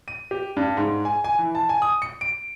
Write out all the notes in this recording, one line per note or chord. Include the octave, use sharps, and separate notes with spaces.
D#7
G4
G2
G#2
G#5
G#5
E3
A5
G#5
D#6
C#7
D7